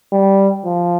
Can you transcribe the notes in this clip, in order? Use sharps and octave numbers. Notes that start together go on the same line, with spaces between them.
G3
F3